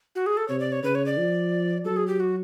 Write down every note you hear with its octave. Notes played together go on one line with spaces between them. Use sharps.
F#4
G#4
A4
C3 C#5
D5
C#5
C#3 B4
C#5
D5
F3
F#3 A4
G#4
G4
F#4